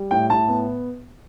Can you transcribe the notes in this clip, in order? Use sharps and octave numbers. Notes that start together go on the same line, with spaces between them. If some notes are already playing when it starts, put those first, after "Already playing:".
Already playing: G3
A2 G5
A2 A5
B3